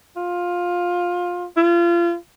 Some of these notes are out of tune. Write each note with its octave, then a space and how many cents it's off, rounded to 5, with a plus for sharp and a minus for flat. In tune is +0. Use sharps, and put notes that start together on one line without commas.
F4 +15
F4 -30